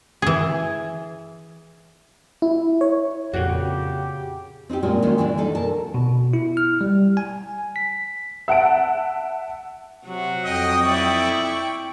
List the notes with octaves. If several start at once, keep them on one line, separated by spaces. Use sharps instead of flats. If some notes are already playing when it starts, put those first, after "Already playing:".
E3 G#4
E4
C#5
F2 A#2 C#3 F#4 G4
C4 D#4 E4 G4
A#2 G3 G#3 C#4 F4 F#4
D#3 E3 G#3 A#3 C#4 D#4
D3 E3 G3 D4
D4 D#4 A4
B2 A4 A#4 A5
B2
E4
F6
G3
G#5
B6
E5 F#5 A5 D7
C3 F#3 F#4
F2 D#5 G5 D#6
E4 D5 C#6
G5